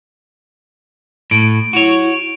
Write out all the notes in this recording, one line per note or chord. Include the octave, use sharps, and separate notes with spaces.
A2 D7
E4 F#4 C#5